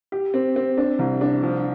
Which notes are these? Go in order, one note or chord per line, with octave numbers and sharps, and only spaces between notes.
G4
C4
C4
D4
C2
D4
F3